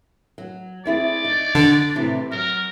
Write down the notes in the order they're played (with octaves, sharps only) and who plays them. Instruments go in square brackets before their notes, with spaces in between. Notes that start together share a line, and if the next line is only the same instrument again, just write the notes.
[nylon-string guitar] F#3
[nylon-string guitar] C4 E4 G#4 [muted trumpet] D5
[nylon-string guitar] D#4
[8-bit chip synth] D3
[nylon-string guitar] A2 C3 E3
[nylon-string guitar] F#3 [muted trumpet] A#4